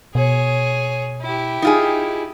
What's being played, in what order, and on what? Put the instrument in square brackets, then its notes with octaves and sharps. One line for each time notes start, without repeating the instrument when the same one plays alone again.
[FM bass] B2 [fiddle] G#4 C#5
[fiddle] E4 G4
[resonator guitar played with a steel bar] D#4 F4 G#4